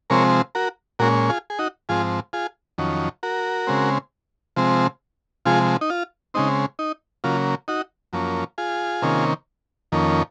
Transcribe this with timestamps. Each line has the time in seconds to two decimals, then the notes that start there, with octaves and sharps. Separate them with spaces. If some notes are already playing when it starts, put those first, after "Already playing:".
0.10 C3 F3 G#3 C4 A#4 C#5
0.55 F#4 A#4
0.99 A#2 G#3 C#4 F#4 A#4
1.29 F4 G#4
1.50 G#4
1.59 D#4 F#4
1.89 G#2 F3 C4 F4 G#4
2.33 F4 G#4
2.78 F2 D#3 F#3 C#4
3.23 F#4 A#4
3.67 C#3 G#3 C4
4.56 C3 F3 G#3 C4
5.45 C3 F3 G#3 F4 G#4
5.81 D#4
5.90 F4
6.34 C#3 G#3 C4 D#4
6.79 D#4
7.24 C#3 F#3 A#3 F4
7.68 D#4 F#4
8.13 F#2 F3 A#3 C#4
8.58 F4 G#4
9.02 C3 D#3 A#3 C#4
9.92 F2 D#3 A#3 C#4